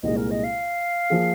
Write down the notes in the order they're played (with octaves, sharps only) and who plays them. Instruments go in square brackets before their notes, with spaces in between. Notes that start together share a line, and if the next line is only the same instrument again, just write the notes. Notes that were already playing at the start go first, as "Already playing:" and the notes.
[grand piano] C2 A#2 G#3 [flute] D#5
[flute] A#4
D#5
F5
[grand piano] F3 A#3 G#4